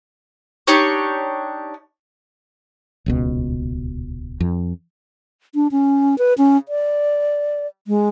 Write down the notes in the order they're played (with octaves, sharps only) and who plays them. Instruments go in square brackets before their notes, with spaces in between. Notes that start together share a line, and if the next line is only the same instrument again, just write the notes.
[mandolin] D4 D#4 G4 C#5
[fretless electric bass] D#1 C#2 B2
F2
[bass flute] D4
C#4
B4
C#4
D5
G#3